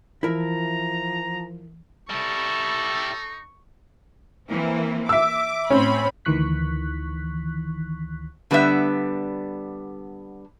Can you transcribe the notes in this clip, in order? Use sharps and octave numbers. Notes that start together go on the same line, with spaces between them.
E3 F3 E4 A#4 E5 A#5
G3 D#4 E4 A4 C#6
E3 A#3 C4
E5 D6 E6
A2 C4 C#4 B5
D2 D#3 E3 C#6 F#6 B6
D3 G3 B3 D4 E5